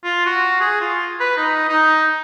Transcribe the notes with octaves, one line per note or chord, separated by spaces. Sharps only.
F4
F#4
G#4
F4
B4
D#4
D#4